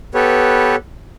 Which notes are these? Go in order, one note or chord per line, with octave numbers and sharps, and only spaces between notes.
B3 G4 A4 B4 C#5